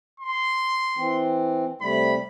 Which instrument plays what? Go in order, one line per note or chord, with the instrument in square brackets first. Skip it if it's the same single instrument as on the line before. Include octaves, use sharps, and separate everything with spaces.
[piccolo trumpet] C6
[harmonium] E3 C4
[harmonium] C3 G3 A3 [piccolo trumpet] B5